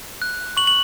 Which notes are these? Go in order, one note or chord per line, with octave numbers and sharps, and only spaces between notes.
F#6
C#6 F#7
F#7